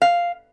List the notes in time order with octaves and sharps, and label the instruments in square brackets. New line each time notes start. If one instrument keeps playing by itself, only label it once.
[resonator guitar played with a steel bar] F5